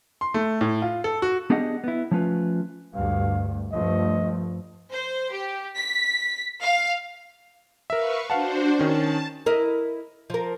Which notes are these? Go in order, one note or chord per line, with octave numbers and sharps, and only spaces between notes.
C6
A3
A2
F4
A4
F#4
B3 D4 G4 G#4 D#5 F#5
B3 E4
F3 A3 C#4 F4 B4
D2 G2 F5
G2 F3 A3 D#5
C5
G4
B6
F5
A#4 B4 E5 F5 C#6
D4 F#4 C5 F5 F#5 A5
D#3 C#4 A5
E4 A#4 D#5
F3 A#4